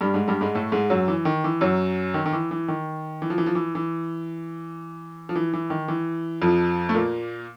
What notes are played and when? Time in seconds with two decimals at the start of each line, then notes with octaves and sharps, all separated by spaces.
0.01 G2 G3
0.14 G#2 G#3
0.28 G2 G3
0.41 G#2 G#3
0.55 A2 A3
0.72 G#2 G#3
0.90 F#2 F#3
1.08 E3
1.25 D#3
1.44 E3
1.61 F#2 F#3
2.14 D#3
2.26 D#3
2.33 E3
2.51 E3
2.68 D#3
3.22 E3
3.30 F3
3.38 E3
3.46 F3
3.55 E3
3.75 E3
5.29 F3
5.36 E3
5.53 E3
5.70 D#3
5.88 E3
6.42 F2 F3
6.89 A3
6.95 A#2 A#3